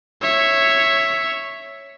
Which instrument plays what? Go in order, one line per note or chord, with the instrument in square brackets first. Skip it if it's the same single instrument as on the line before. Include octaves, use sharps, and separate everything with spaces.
[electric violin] C#5 E5